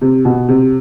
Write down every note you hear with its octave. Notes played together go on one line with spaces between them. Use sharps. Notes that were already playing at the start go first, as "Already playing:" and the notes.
C3
B2
C3